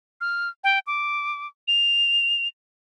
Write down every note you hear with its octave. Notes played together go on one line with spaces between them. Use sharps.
F6
G5
D6
F7